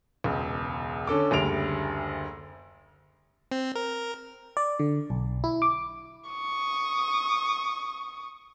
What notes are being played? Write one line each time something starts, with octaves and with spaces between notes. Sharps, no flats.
E1 C#2
D3 C#4 A4 D6
F#1 D2 G3 D7 F7
C4
A#4
D5
D3
B1
E4
D6
C#6 D#6